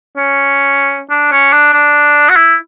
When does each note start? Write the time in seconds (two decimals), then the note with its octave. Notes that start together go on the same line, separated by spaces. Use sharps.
0.17 C#4
1.10 D4
1.32 C#4
1.53 D4
1.73 D4
2.29 F#4
2.36 E4